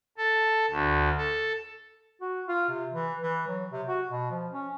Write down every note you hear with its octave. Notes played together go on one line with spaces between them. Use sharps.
A4
D2
A4
F#4
F4
C3
E3
E3
F#3
C3
F#4
B2
F3
C#4